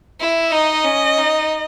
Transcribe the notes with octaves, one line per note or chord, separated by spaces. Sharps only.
E4
D#4 D#5
C#4
D#4